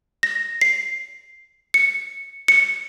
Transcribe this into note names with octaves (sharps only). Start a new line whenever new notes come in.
A#6
C7
C#7
C#7